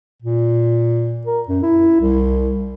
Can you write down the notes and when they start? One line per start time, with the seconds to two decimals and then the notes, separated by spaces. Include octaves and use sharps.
0.22 A#2
1.27 A#4
1.49 F#2
1.63 E4
2.01 C2